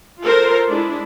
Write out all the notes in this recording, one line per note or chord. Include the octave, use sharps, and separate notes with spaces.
F4 A4 A#4 C5
G#3 D4 E4